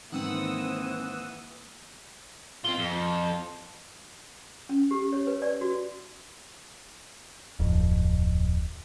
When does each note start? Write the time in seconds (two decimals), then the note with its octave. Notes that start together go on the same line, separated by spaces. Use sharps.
0.12 G#2 D#3 E3 A#3 C4 F#5 D#6 E6
2.65 C4 F4 G7
2.78 F2
4.69 C#4
4.91 G4
5.13 C#5
5.27 B4
5.42 D5
5.61 F#4
7.59 D1 F2